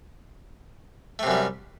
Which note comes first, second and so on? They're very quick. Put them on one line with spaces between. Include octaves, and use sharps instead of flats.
A3 C3 F#2 G3